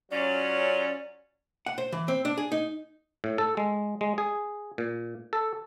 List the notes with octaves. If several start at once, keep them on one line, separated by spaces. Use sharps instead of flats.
F#3 C#4 F4 D5
F#5
C5
E3
C4
D4
G#4
D#4
A2
A4
G#3
G#3
G#4
A#2
A4